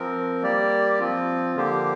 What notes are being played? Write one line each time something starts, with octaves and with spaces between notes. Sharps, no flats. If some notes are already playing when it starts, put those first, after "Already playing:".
Already playing: F3 C4 A#4
G3 A#3 G4 D5
F3 C4 F4
D3 F3 A#3 G4 C5